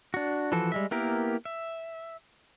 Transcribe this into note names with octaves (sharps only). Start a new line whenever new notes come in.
D4 F#4
E3 F3 F#4 A4
G3 G#3 E5
A#3 B3 E4 G4 A#4
E5